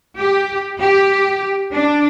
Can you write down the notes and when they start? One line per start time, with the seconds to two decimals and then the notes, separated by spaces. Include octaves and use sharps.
0.17 G4
0.80 G4
1.72 D4